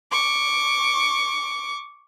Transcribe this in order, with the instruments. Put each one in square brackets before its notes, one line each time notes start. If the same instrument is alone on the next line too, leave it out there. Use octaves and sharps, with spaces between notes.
[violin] C#6 D6